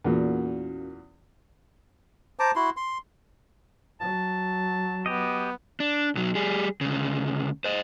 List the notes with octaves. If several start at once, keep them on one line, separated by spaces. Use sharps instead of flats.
E2 A#2 A#3 C#4 F#4
C5 A5 A#5 D6
E4 F#4 C6
C6
F#3 A5
B3 G4 D#5
D4
B1 F#3
G3 G#4
D2 C#3
C5 D#5